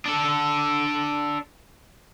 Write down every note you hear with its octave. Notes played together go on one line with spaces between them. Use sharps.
D4 A4